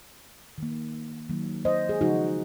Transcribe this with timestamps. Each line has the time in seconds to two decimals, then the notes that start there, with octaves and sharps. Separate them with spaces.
0.58 D#3 A#3
1.29 D#3 F#3 A#3
1.65 C5 D#5
1.89 G#4
2.01 C#3 F3 G#3 D#4 F#4